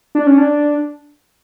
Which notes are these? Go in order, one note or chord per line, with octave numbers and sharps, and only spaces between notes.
D4
C#4
D4